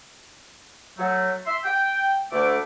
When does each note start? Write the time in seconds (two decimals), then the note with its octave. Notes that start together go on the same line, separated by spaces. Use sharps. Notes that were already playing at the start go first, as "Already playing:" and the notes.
0.97 F#3 A3
1.46 E5 C6
1.64 G5
2.31 D2 A3 D6